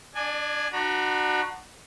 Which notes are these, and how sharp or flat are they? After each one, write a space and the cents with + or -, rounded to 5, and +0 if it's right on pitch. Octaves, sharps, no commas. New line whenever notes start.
D4 +0 D5 +40 G#5 +0
D4 +40 F#4 +0 A#5 +45